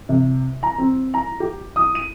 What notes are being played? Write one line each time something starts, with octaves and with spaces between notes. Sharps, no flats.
C3
A#5
C4
A#5
G4
D#6
D#7